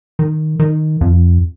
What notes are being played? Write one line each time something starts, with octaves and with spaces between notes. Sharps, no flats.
D#3
D#3
F2